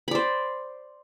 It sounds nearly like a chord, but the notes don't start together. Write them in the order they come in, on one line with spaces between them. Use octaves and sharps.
B5 D5 C5